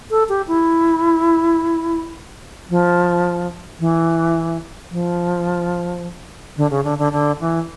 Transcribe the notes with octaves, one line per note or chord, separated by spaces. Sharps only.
A4
G4
E4
F3
E3
F3
D3
C#3
D3
D3
D3
E3